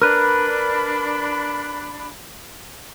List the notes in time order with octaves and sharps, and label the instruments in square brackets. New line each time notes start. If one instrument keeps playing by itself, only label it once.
[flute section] D4 B5 [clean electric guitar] A#4 B4